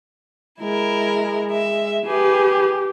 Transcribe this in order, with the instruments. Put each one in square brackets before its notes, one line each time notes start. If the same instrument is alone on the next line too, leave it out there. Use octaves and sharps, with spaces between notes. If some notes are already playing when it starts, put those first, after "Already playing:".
[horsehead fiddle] G#3 [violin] E4 A#4
[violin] E5
[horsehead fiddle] G4 [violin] G#4 B4